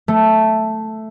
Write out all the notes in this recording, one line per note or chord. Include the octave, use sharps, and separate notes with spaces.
A3